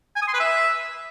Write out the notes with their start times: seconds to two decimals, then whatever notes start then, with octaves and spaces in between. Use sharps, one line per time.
0.16 G#5
0.22 D#6
0.28 C6
0.34 B4
0.40 E5